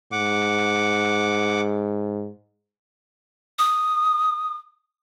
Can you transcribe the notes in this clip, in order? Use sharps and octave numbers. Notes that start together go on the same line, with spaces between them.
G#2 F#5 D6
D#6